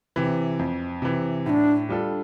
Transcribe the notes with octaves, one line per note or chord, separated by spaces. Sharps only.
C3 E3
F2
C3 E3
A2 D4 E4
G3 D4 F4 A4